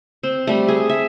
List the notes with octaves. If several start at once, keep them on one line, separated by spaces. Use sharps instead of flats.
C4
G3 A3
G#4
E5